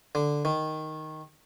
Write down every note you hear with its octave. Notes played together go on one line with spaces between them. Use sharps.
D3
D#3